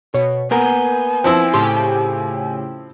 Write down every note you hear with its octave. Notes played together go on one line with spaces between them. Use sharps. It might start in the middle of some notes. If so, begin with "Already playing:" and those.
B2 C#5
A#3 B3 A#4 G#5 G6
F3 C4 E4
A2 C#3 G4 C6